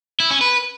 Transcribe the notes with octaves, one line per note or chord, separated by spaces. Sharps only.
E4
C#4
B4